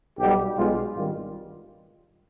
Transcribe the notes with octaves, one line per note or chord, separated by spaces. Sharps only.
B1 B2 G3 G4
B1 B2 G#3 F4
G#1 G2 D#3 G3 F4